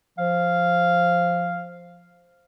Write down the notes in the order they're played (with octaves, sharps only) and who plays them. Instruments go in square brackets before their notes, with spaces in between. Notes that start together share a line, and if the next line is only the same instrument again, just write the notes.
[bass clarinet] F3 [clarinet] F5